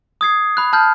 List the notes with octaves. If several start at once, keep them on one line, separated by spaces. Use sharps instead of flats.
D#6 G#6 C7
B5 F#6
A5 F6 G6